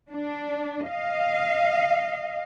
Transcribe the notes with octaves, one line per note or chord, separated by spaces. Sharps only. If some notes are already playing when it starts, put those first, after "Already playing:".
D4
D#5 F5